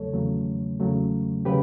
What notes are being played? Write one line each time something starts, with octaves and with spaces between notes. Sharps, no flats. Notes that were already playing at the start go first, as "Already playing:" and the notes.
Already playing: E2 C#3 F#3 A3 A4 C#5
E2 C#3 F#3 A3
E2 C#3 F#3 A3
C#3 F#3 G4 B4